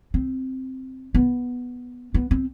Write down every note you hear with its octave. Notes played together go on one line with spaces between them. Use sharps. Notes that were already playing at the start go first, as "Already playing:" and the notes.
C4
B3
B3
C4